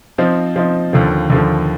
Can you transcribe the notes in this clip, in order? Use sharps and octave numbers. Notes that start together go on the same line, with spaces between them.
F3 C4 D#4
F3 C4 D#4
D#2 D3 F3
D#2 D3 F3